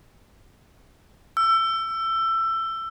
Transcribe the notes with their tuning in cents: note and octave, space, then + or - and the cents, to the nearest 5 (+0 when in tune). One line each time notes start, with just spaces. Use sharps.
E6 +20